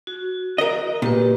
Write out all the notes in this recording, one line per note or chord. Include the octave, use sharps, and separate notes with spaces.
F#4
A#4 D#5
A#2 G4 B4